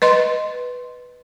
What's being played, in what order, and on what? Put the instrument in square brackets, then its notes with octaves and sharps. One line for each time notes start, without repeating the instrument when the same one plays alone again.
[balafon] B4 D#5 C6